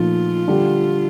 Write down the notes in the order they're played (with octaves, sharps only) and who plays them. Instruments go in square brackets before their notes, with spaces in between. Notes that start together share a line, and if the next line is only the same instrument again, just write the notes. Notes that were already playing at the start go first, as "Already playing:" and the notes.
Already playing: [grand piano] A#2 F3 A3 D#4 [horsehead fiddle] F4
[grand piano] D3 G3 D4 G4